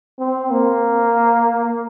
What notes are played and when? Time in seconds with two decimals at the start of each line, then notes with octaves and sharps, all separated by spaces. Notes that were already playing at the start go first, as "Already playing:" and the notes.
0.19 C4
0.51 A#3